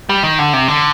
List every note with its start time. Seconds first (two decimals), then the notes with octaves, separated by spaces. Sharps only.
0.09 G3
0.23 D#3
0.39 D3
0.53 C3
0.68 D3